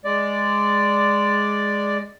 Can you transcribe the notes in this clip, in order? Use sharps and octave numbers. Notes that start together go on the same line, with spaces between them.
G#3 D5